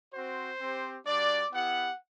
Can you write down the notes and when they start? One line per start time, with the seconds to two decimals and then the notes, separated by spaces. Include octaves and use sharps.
0.13 C4 F#4 C5
0.60 C4 G4
1.05 G3 D4 F#4 D5
1.52 B3 E4 G4 F#5